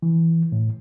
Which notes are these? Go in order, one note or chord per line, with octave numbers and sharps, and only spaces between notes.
E3
A2